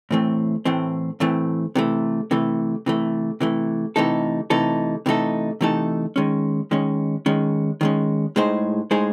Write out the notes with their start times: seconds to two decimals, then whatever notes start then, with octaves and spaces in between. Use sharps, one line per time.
0.11 A2 E3 A3 C4
0.65 A2 E3 A3 C4
1.20 A2 E3 A3 C4
1.75 C3 E3 A3
2.31 C3 E3 A3
2.86 C3 E3 A3
3.41 C3 E3 A3
3.96 C3 E3 A3 D#4 A4
4.50 C3 E3 A3 D#4 A4
5.06 C3 E3 A3 D#4 A4
5.61 C3 E3 A3 D#4 A4
6.16 D#3 G#3 C#4
6.71 D#3 G#3 C#4
7.26 D#3 G#3 C#4
7.81 D#3 G#3 C#4
8.36 A2 G#3 D#4 G#4 C5
8.91 A2 G#3 D#4 G#4 C5